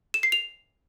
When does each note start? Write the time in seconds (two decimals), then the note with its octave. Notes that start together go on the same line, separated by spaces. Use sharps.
0.14 E7
0.23 C7
0.32 F7